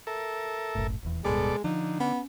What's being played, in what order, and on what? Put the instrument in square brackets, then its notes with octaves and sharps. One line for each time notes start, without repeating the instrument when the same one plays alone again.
[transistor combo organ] A4 A#4 E5
[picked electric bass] F#1 B1 A2
D#1 E2
[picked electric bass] D1 G2 [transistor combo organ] B2 A4 D5 [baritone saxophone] G#3
[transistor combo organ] D3 [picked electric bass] F3 [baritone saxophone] D#4
[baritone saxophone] B3 [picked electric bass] C#4